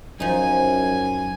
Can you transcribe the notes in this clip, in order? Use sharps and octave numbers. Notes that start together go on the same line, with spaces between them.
F#2 F3 D#4 G#5